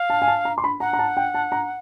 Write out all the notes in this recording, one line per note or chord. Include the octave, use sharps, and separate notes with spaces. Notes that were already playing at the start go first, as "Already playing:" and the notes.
Already playing: F5
A5
G#5
A5
A#5
C6
B5
F#5 A#5
A#5
A5
G5
A5
A#5